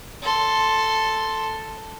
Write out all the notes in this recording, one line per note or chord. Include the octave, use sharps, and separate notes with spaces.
A4 C6